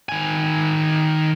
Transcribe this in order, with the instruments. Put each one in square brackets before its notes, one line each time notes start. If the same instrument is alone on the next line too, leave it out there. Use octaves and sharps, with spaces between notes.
[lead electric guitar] D#3 G#5